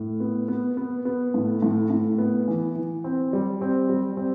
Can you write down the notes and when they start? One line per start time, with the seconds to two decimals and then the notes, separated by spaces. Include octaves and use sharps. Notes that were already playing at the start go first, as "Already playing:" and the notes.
Already playing: A2
0.20 B3
0.48 B3
0.77 B3
1.05 B3
1.34 A2
1.62 A2
1.90 A2
2.18 B3
2.48 E3
2.75 E3
3.04 C4
3.33 G3
3.61 C4
3.89 G3
4.17 C4